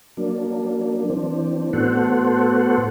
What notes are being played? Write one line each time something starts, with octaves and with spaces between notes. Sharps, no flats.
F#3 A#3 D4
E3 C4 D4
A2 B3 F#4 A4 C5 F#5